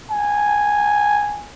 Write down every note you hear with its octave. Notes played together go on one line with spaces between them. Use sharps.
G#5